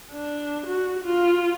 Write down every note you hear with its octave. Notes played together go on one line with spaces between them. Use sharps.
D4
F#4
F4